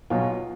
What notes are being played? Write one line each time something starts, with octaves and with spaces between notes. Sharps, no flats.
B1 B2 F#3 F4